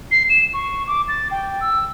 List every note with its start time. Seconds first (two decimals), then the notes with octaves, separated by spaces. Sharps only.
0.11 C7
0.30 E7
0.54 C#6
0.87 D6
1.08 A6
1.31 G5
1.61 E6